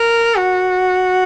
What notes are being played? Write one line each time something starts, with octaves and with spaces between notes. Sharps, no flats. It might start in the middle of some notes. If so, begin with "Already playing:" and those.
Already playing: A#4
F#4